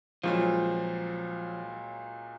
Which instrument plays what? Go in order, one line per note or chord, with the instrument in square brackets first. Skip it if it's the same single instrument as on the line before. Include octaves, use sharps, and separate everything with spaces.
[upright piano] C#2 A#2 F#3 [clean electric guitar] F3